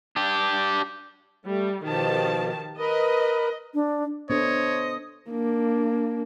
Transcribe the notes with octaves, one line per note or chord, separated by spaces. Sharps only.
D4 G4
G3 A3
B2 D#3 F3 G4 A5
A#4 B4 D#5
D4
B3 D4 A4 C5 C#5 D#5
A#3 D4